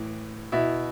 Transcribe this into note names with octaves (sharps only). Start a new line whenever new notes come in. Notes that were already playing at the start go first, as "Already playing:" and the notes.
Already playing: A2 E3
B2 E4